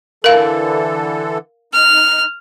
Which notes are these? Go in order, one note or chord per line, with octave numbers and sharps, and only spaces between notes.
D3 E3 A4 A#4 F5
D#4 F6